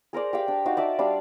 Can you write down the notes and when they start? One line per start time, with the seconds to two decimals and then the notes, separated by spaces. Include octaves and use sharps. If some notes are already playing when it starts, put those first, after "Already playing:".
0.13 G#4 A#4 C5 D5
0.33 G4 F5 G5
0.48 D4
0.65 D#4 F#4 F5
0.77 D5 E5 A5 D6
0.99 G3 D4 F5 E6